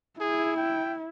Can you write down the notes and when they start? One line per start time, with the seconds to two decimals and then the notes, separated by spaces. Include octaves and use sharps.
0.20 E4 G#4
0.57 G5